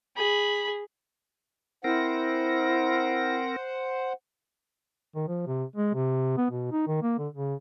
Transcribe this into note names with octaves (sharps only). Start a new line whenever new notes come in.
G#4 B5
C4 E4 A#4 C5 F#5 A#6
D#3
F3
C3
G#3
C3
B3
B2
D#4
D#3
A#3
D3
C#3